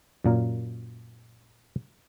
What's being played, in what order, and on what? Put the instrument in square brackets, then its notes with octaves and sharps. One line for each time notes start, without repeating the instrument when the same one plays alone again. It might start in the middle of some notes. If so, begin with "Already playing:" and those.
[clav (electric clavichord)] F#2 A#2 A#4